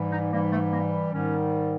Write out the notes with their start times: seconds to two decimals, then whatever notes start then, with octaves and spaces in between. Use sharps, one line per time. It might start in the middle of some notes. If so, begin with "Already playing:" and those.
Already playing: G#2 E3 G3
0.11 D#4
0.31 G#2 E3 G3 A#3
0.51 A3
0.71 A#3
1.10 G#2 D#3 G3 C#4